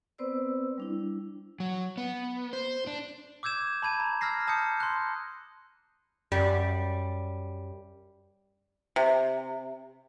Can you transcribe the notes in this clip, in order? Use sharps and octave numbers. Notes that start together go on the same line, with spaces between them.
B3 C4 B4 C5 D5 E6
G3 D4 E4
F#3
B3
C5
D4
D6 E6 G6 G#6 E7
A5 B5 G#6 D#7
A#5
E6 F6 G#6 A#6 C7
A5 D#6 G6 C#7
C6 F#6
F#2 G3
C3